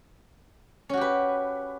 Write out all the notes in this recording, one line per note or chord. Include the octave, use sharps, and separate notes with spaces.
C#4 F#4 G4 B4